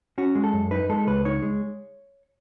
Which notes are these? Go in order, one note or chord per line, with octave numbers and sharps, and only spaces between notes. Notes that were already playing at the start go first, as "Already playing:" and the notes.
C#4 F#4
G#3
A4
F#2
D#4 B4
G#3 A4
C#2 B4
D#4 C#5
G#3